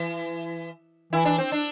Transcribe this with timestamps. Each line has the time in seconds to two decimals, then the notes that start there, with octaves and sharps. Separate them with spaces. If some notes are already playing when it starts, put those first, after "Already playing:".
Already playing: E3
1.13 E3 E4
1.25 D4
1.38 C4
1.52 D4